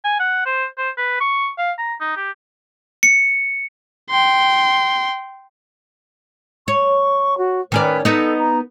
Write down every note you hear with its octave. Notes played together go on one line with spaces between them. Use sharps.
G#5
F#5
C5
C5
B4
C#6
F5
A#5
D#4
G4
C#7
G5 C6
C#5 C#6
F#4
D#3 C#4 B4 D5
B3 D#4 A4
A#5